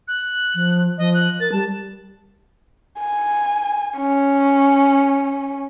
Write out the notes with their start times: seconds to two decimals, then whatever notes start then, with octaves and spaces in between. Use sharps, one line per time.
0.08 F#6
0.55 F3
0.98 F3 D#5
1.14 F#6
1.40 A#4 A6
1.52 G3 A5
2.99 G#5
3.98 C#4